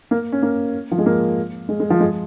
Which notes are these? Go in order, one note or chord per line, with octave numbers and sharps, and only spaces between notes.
A#3
C#4
A#3
F3
G#3
A#3
G#3
G#3
F3
G#3